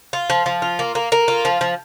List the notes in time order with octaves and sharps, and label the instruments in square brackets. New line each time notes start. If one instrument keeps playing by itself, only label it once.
[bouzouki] F4
F3
F3
F4
A#3
A#3
A#3
F4
F3
F3